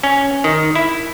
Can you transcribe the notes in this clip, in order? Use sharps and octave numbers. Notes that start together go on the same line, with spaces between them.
C#4
D#3
E4